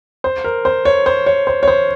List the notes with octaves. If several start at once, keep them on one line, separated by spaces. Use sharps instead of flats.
C5
A#4
C5
C#5
C5
C#5
C5
C#5
C5